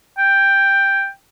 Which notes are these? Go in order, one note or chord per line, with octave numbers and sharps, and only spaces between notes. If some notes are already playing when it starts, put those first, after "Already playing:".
G5